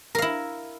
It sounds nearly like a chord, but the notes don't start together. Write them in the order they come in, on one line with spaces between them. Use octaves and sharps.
A#4 F5 E4